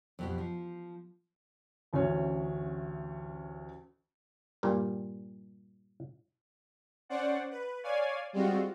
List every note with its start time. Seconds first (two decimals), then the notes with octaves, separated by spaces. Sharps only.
0.19 F2 B2 G4
0.38 F3
1.93 A1 D2 C#4 C#5
4.63 G2 A#2 G3
7.09 C#4 C5 D5 F#5
7.51 B4
7.83 C#5 D5 F5 G#5
8.33 G3 G#3 C4 F4 F#4